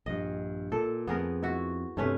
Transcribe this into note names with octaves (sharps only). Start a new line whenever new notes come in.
A#1 G2 D#5
A#2 A4
F2 B3 G#4 A#4
E4 F#4
G2 C3 A3 C#4 B4